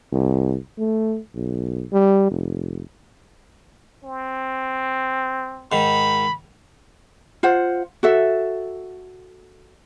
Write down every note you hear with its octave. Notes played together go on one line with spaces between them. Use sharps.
C2
A3
B1
G3
F1
C4
G#2 D#3 B5
F4 C5 F#5
F#4 A4 E5